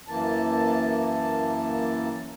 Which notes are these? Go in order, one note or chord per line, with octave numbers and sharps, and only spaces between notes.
F#2 E3 A#3 A5